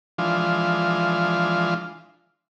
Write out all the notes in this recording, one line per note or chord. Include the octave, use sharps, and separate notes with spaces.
E3 F3 G#3 D4 F4